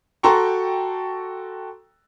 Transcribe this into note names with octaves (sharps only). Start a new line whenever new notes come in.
F#4 A4 G5 A#5 C6 C#6